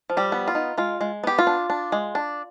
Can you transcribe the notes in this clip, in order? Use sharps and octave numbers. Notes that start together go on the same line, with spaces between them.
F3
G3 G4
B3
F4
D#4
G#3 F4
G#3
B3 G4
F4
D4
D4
G#3
D4